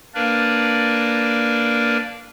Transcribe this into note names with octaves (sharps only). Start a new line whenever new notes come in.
A#3 D4 A#4 B4 D5